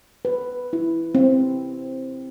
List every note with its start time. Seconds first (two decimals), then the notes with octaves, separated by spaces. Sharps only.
0.25 B4
0.73 E4
1.15 C4